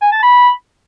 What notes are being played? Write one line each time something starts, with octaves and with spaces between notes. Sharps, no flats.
G#5
A5
B5